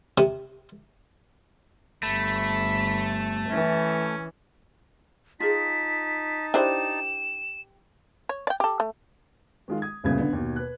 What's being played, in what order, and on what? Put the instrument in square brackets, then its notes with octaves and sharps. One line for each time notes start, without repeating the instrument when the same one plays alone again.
[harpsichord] C3
[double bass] G1 [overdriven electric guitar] A3 [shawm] B5
[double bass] E3 E4 [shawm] C#4
[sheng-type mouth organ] D#4 A5 [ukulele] F4 G#4 [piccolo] B6
[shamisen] D4 E4 C5 [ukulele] G4 [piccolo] E7
[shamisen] C#5
D5 G5
G4 A4
A3
[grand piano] D#3 G#3 F4
D#6 G#6
D1 C2 A#2 C#3 B3 G#6
D3 B3
D#2 B2
B4 F#6